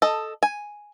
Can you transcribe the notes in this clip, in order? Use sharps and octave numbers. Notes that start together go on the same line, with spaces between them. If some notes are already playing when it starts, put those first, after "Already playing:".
A4 D#5
G#5